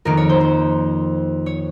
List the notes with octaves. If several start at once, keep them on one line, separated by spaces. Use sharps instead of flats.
F2 D#3 A#3 A#4
C#5
C5
C5
C#5